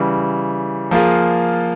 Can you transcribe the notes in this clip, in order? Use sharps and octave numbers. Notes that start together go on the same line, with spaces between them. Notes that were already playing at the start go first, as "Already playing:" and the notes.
Already playing: C#3 E3 G3
F3 A#3 F4 G#4